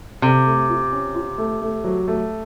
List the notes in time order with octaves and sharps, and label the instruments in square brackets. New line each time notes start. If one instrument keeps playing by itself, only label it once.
[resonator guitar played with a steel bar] C3 [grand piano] A4
[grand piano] A3
F4
C#4
F4
A3
A3
F#3
A3